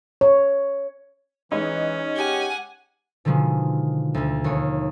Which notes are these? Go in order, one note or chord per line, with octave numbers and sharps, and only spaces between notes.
C#5
E3 G#3 C#4 D#4
G4 F#5 G#5
B2 D3 D#3 F3 G#3
D2 D3
D#2 C#5